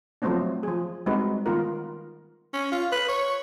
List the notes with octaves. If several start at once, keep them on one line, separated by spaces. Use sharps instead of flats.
F3 F#3 A3 B3 C4 D4
F3 G#4
G3 G#3 C4 D#4 F#4 B4
D#3 B3 F4 A#4
C#4
F4
B4
C#5